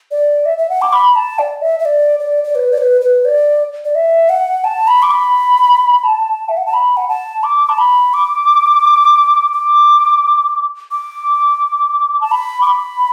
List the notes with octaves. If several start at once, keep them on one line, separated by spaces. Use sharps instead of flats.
D5
E5
E5
F#5
D6
B5
A5
D5
E5
E5
D5
D5
D5
B4
D5
B4
B4
D5
D5
E5
F#5
A5
B5
D6
B5
A5
E5
F#5
A5
B5
F#5
A5
D6
A5
B5
D6
D6
D6
A5
B5
D6
B5